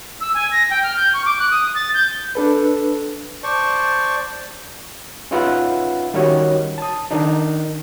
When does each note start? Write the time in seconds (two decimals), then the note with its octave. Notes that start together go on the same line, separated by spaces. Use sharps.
0.21 E6
0.35 G#5
0.52 A#6
0.70 G5
0.83 F6
0.97 G6
1.13 C#6
1.25 D6
1.39 F#6
1.51 D#6
1.75 A6
1.94 G6
2.35 D4 A4 B4
3.44 C5 D5 A5 C#6
5.31 C#4 D#4 F4 B4 E5 F#5
6.14 D#3 G3 C#4 F#4 C#5 D#5
6.78 A5 D#6
7.11 D#3 D4 D#4